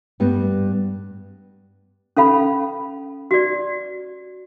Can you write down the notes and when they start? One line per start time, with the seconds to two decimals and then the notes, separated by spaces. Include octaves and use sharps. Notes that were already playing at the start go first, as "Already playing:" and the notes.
0.20 G2 G3 B3
2.17 C#4 A4 F5 B5
3.31 F#4 D5